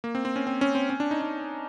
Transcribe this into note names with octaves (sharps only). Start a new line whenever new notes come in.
A#3
C4
C4
C#4
C4
C#4
C4
C#4
D4
D#4
D4